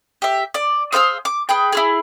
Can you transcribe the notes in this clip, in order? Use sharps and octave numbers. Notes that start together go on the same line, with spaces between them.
G4 E5
D5
G#4 C5 F5 E6
D6
G#4 B4 G5
E4 F4 G#4